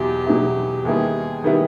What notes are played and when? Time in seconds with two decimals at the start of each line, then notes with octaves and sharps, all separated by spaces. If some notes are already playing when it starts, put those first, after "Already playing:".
Already playing: E2 B2 F#3 B3 E4 G4
0.26 E2 B2 F#3 B3 E4
0.85 D#2 D#3 G3 B3 E4 G#4
1.44 D#3 G3 B3 E4